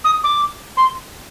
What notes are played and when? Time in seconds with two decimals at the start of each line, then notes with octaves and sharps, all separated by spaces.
0.04 D#6
0.24 D6
0.77 C6